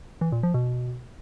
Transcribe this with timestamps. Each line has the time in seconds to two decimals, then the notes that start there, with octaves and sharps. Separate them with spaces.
0.21 E3
0.32 A#2
0.43 F3
0.54 B2